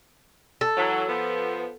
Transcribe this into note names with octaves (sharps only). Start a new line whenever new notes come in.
A4
E3 F#3
F3 B3